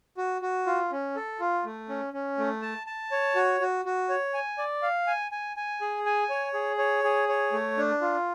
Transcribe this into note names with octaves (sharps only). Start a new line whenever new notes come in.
F#4
F#4
F4
C#4
A4
F4
A3
C#4
C#4
A3
A5
A5
C#5
F#4
F#4
F#4
C#5
G#5
D5
F5
G#5
G#5
G#5
G#4
G#5
C#5
G#4
C#5
G#4
C#5
A3
D4
F4